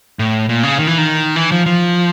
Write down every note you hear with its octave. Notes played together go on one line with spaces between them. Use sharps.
A2
A#2
C#3
D#3
E3
D#3
E3
F3
F3